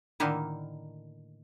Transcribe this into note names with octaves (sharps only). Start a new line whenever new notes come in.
A2 D3 D#3 A#3 D#4 E4